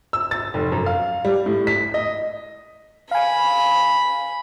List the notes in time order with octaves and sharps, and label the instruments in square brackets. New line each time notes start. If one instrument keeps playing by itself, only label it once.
[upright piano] E6
A6
F1
F#2
F5
G3
A2
B6
D#5
[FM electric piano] F5 G#5 [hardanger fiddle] B5